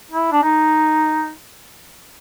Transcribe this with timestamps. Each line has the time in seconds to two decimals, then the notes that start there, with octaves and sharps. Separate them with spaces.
0.11 E4
0.32 D4
0.43 D#4